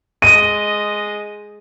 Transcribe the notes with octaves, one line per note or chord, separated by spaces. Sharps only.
G#3 D#5 D#7